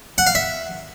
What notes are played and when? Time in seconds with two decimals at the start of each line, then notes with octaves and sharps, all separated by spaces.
0.18 F#5
0.27 F5
0.35 E5